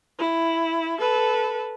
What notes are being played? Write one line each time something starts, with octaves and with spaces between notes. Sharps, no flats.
E4
A4 B4